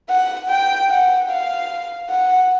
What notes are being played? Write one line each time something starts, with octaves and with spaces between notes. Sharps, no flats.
F#5
G5
F#5
F5
F#5